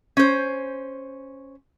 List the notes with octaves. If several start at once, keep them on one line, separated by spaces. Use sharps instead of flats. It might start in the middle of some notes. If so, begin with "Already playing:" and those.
C#4 C5